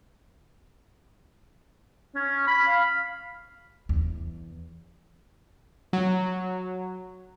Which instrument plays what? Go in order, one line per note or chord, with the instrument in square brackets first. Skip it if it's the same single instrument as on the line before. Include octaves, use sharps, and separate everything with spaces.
[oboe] C#4
B5
F5
[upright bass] E2
[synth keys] F#3